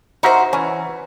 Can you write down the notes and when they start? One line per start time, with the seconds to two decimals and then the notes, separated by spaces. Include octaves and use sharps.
0.23 D#4 F#4 A#4 C5 E5
0.53 E3 C#4